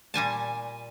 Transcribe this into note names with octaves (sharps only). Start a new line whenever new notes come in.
A#2 G3 G#5 A5